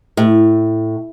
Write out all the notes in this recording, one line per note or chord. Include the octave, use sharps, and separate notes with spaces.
A2